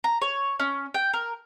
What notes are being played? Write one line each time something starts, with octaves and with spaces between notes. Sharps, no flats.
A#5
C#5
C#4
G5
A#4